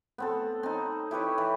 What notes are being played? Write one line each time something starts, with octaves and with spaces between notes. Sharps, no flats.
B3 C4 A4
C4 D#4
E4 G4 B4 C#5
E3